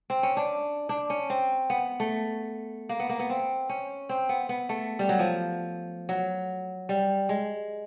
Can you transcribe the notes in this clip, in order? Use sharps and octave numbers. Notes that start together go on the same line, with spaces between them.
C4
C#4
D4
D4
C#4
C4
B3
A3
A#3
B3
A#3
B3
C4
C#4
C4
B3
B3
A3
G3
F#3
F3
F#3
G3
G#3